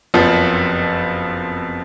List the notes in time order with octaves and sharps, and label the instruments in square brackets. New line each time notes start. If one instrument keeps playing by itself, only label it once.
[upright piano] F#1 F2 F3 B3